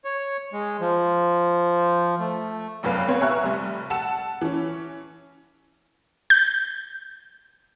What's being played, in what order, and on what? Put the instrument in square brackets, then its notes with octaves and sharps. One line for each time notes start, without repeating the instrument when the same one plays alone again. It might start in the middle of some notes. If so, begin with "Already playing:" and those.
[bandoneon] C#5
G#3
F3
A3
[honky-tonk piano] F1 B1 F#2 B4 F5
B3 C4 B4 C#5
E5 G#5 A#5 C#6 F6 F#6
F1 G3
F#5 A5 E6 E7
E3 C#4
[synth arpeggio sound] G6